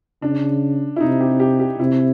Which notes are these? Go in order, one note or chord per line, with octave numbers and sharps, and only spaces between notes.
C#3 D4
E4
C3 D#4
G4
G4
G4
C3 E4